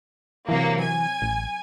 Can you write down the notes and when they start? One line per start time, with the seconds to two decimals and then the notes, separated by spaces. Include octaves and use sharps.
0.49 C3 E3 F#3 A#3
0.82 G#5
1.22 A1